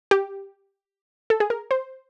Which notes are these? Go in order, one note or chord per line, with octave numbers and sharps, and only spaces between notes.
G4
A4
G#4
A#4
C5